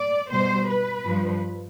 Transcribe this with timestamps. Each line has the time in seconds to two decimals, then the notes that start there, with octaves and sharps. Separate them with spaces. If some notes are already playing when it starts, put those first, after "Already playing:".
Already playing: D5
0.31 B2 G3 C5
0.68 B4
1.04 G2 F3